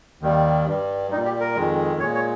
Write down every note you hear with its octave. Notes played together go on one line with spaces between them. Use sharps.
D#2 D#3 G3
G2 G3
A#2 G3 D#4
G4
A#4
F2 D#3 G#3
A#2 G#3 C#5
C#5